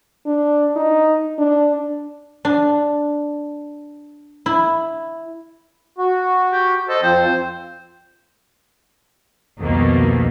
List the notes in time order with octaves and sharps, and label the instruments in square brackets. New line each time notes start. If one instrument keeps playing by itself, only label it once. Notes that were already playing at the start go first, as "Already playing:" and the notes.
[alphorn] D4
D#4
D4
[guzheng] D4
E4
[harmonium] F#4
[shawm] G4
[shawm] A4 [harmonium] C5 D#5
[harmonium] F2 F3 C4 [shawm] C5
[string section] C2 F2 B2 D#3 A3 A#3